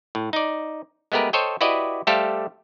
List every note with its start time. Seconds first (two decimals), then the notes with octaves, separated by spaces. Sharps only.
0.15 A2
0.33 D#4 D5
1.12 G#3 A3 B3 G4 A#4 B4
1.33 A4 C5 C#5 D#5 G5
1.61 E4 F#4 G4 B4 D5 D#5
2.07 G3 A3 G4 A4 C5 F5